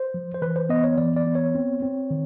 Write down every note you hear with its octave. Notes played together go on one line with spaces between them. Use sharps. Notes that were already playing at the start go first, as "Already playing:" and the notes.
Already playing: C5
F3
C5
E3 B4
C5
B3 D#5
C#5
E3 D5
D5
B3
C#5
C4
C4
D#3